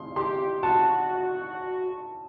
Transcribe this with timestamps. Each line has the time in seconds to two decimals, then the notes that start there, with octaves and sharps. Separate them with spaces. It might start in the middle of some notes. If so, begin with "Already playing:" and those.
Already playing: C6
0.16 G4 C6
0.63 F#4 A5